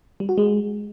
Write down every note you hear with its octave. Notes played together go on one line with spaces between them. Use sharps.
G3
F#4
G#3